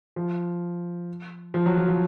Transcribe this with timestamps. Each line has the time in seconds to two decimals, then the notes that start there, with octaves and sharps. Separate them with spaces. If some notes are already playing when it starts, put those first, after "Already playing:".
0.16 F3
1.54 F3
1.66 F#3
1.77 F3
1.88 F3